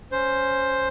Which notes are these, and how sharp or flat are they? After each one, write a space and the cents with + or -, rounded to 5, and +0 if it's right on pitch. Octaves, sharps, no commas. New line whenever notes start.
C#4 +0 C5 +5